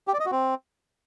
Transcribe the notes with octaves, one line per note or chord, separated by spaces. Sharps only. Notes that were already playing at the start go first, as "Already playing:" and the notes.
G4
D5
D#5
F#4
C4